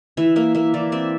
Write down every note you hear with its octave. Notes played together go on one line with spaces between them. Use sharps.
E3 E5
A#3 E5
A#3 E5
E3 D5
C4 E5